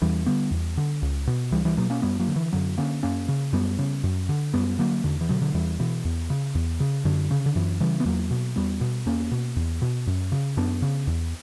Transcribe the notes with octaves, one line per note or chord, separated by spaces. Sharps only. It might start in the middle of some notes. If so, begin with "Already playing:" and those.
E2 E3 G3
D3 G3 B3
E2
D3
C#2
B2
C#2 E3 G3
E3 G3
B2 F#3 A#3
A#3 C#4
F#2 G3 B3
F#3 A#3
D3
E3
F#2 D3 F#3
D3 A#3 C#4
F#2 A#3 C#4
C#3
F#2 G3 B3
C#3
F#2
D3
F#2 G3 B3
D3 F#3 A#3
E2 D3
E3
B2 D3 F#3
D3 F#3
E2 E3 G3
B2 E3
E2
C#3
E2
C#3
F#2 D3
C#3
D3
F#2 E3
C#3 E3 G3
B3
E2 F#3 A#3
B2
E2 G3 B3
B2
E2 A#3 C#4
B2
E2
B2
F#2
C#3
F#2 B3 D4
C#3
E2